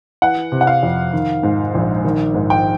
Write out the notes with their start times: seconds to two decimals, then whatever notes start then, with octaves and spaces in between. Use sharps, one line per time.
0.22 E3 F#5
0.52 C3
0.61 F#5
0.67 F5
0.83 F2
1.13 D#3
1.43 G#2
1.75 A#1
2.05 D#3
2.34 G#2
2.50 G5